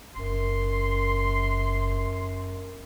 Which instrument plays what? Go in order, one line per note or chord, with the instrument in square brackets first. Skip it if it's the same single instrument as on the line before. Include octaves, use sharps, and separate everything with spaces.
[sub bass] F#1 [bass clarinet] F#2 [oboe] C6